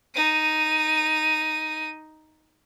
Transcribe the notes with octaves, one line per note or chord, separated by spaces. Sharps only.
D#4 D#7